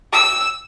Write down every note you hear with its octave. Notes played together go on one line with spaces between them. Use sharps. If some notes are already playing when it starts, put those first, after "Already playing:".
E6